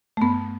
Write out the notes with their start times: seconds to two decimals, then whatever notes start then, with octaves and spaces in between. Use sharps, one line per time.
0.17 A3
0.22 G2 B3